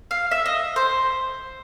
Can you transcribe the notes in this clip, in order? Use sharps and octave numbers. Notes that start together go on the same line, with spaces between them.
F5
E5
D#5
C5